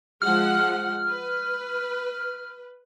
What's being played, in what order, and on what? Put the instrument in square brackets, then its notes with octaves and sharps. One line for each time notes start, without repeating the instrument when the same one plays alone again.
[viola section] F3 G#3 F#5 [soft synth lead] F6
[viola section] B4